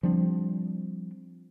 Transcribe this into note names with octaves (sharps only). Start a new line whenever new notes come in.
F3 G3 C4 D4